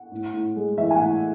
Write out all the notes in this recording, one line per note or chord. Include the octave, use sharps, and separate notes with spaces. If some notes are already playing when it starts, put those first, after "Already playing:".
Already playing: F#5
A2
A2
G#3
E3 E5
G#5
A2 F#5